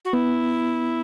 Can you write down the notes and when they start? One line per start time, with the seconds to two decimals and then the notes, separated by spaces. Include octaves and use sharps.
0.05 F#4
0.13 B3 E4